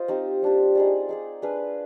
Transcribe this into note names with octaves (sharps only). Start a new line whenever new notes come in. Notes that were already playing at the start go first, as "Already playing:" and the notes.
Already playing: F4 C5 D#5
C4 D#4 G4
G3 D4 G4
D#4 G#4 D5
D#4 G#4 D5
D4 G#4 B4 F5